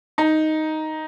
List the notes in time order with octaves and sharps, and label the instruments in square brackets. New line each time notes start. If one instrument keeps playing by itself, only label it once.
[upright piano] D#4